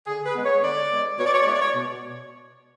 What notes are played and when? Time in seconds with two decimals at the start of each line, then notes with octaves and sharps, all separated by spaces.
0.06 D3 G#4
0.25 B4
0.35 G#3 B3
0.44 C#5
0.62 D3 D5
0.90 G#3 B3
1.17 B2 C#5
1.25 D5
1.33 C#5
1.40 D5
1.46 G#3 B3 E4 C#5
1.53 D5
1.61 C#5
1.74 B2